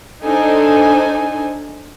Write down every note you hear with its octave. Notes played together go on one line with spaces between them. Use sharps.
D4 D#4 A4 C5 G#5